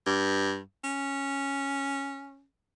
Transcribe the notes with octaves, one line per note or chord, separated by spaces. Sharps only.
G2
C#4